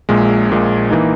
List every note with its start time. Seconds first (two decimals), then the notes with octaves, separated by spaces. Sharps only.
0.09 A#1 A#2 G#3
0.49 A#1 A#2 G#3
0.90 E3 A#3 D#4